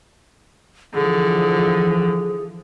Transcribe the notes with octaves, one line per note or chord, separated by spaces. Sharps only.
D3 E3 F3 G#4